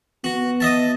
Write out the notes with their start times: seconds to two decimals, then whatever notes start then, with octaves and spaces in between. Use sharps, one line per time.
0.24 B3 F#4
0.60 D#5 E5 A5